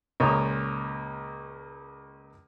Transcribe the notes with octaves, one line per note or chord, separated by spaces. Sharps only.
C#2 A#2 A#3 C#5 A#5 D#6